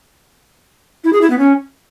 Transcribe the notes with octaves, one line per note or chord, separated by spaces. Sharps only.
E4
G#4
E4
B3
C#4